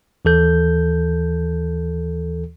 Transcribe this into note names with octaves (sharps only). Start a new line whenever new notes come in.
D#2 E3 A4 G6